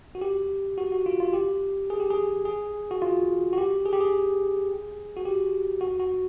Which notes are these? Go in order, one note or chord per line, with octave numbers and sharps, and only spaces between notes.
F#4
G4
F#4
F#4
F4
F4
G4
G#4
G4
G#4
G#4
F#4
F4
F#4
G4
G#4
G4
G#4
F#4
G4
F#4
F#4